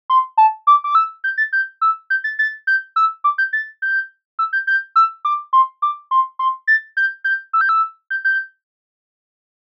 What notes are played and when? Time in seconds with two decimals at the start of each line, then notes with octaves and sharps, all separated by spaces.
0.10 C6
0.37 A5
0.67 D6
0.84 D6
0.95 E6
1.24 G6
1.38 A6
1.53 G6
1.81 E6
2.10 G6
2.24 A6
2.39 A6
2.67 G6
2.96 E6
3.24 D6
3.38 G6
3.53 A6
3.82 G6
4.39 E6
4.53 G6
4.67 G6
4.96 E6
5.25 D6
5.53 C6
5.82 D6
6.11 C6
6.39 C6
6.67 A6
6.97 G6
7.24 G6
7.53 E6
7.61 G6
7.69 E6
8.10 G6
8.25 G6